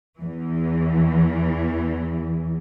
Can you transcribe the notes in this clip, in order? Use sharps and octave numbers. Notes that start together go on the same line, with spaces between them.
E2 E3